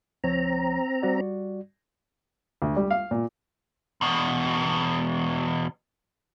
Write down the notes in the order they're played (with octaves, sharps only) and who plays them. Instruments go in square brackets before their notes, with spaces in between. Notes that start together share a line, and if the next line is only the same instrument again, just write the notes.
[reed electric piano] C#2 F3 C#5 [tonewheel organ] C4 A#5
[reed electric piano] G3 F#4 D5
[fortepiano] D2
G3
F5
A#2
[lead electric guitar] E2 B2